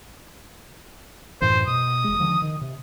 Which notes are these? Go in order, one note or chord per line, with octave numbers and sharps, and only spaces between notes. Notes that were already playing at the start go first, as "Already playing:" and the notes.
F#2 A2 E3 C5
B2 D#6
E1 G#3
D3 D#3 F3
D#3
C3